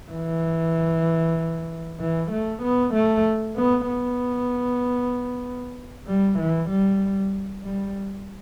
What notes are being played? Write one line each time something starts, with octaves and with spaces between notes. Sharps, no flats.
E3
E3
A3
B3
A3
B3
B3
G3
E3
G3
G3